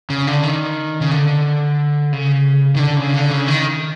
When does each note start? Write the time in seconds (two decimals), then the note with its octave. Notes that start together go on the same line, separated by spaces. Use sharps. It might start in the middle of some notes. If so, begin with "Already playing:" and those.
0.10 C#3
0.27 D3
0.43 D#3
1.01 C#3
1.11 D3
2.13 C#3
2.76 D#3
2.79 D3
2.97 C#3
3.14 D3
3.31 C#3
3.48 D#3